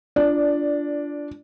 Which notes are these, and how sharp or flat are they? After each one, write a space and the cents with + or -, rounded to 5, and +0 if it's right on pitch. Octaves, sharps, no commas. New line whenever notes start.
D4 -10 F4 -25 D5 +0